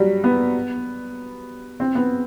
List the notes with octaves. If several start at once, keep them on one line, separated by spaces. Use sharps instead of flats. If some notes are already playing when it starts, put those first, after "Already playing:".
Already playing: F#3 G3
B3
C4
B3